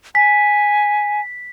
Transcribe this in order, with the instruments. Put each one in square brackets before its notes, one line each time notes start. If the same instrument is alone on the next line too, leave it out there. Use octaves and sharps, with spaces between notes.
[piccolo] G#5 [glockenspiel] B6